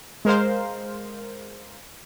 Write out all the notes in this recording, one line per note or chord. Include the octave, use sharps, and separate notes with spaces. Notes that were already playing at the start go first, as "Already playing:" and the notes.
G#3 A#4 C5 F5